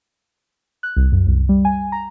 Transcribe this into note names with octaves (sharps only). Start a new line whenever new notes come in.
F#6
C2
F#2
C2
G3
G#5
A#5